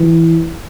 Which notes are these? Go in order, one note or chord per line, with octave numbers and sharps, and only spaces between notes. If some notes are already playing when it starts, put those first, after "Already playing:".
Already playing: E3